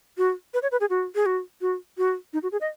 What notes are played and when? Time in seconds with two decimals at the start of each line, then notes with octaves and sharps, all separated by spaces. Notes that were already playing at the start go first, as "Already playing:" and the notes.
0.18 F#4
0.54 B4
0.62 C#5
0.72 B4
0.81 G#4
0.90 F#4
1.15 G#4
1.26 F#4
1.61 F#4
1.98 F#4
2.33 D#4
2.43 F#4
2.52 G#4
2.61 D#5